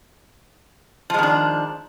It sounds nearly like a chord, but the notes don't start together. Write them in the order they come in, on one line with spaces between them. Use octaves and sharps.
F3 G#3 D#3 D4